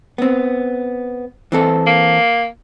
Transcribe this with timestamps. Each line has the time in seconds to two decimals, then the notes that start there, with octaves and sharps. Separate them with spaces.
0.18 B3 C4
1.52 E3 C4 A4
1.87 A#3